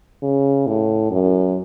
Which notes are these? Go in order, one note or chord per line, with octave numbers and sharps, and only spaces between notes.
C#3
A2
F#2